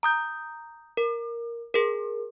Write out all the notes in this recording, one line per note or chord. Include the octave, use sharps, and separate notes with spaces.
A#5 D#6 G6
A#4
G#4 A#4